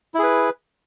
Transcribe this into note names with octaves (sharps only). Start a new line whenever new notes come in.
E4 G#4 B4